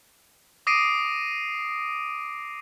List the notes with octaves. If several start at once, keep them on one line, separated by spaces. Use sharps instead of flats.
D6 D#6 A#6 C7 D7 D#7